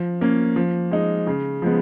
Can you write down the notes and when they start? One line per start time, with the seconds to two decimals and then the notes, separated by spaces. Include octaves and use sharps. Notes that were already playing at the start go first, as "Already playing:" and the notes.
Already playing: F3
0.21 A#3 C#4
0.56 F3
0.91 G#3 D#4
1.27 C#3
1.62 F3 G#3 B3